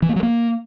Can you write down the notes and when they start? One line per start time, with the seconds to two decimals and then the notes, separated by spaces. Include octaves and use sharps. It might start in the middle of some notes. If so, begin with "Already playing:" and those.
0.02 E3
0.09 A#3
0.16 F#3
0.23 A#3